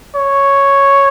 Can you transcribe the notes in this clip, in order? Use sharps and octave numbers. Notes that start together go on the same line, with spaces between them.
C#5